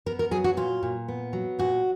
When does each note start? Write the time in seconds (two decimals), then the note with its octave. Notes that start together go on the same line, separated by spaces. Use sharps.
0.06 B3 A#4
0.19 A#4
0.31 F#3 G#4
0.44 F#4
0.57 A#2 F4
0.83 A#2
1.08 B3
1.33 F#3
1.59 A#2 F#4